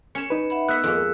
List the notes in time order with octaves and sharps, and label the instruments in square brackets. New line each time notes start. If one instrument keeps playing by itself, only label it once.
[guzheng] C#4 C#5 [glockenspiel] C#7 E7
[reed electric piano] D#4 B4
[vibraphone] E5 F#5 B5
[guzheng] B3 E5 F#5 [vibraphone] E6 [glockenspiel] F#6 B6
[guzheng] F2 G#3 A#3